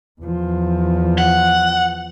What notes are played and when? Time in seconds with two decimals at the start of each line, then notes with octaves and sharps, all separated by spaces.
0.21 E2 F3
1.18 F#5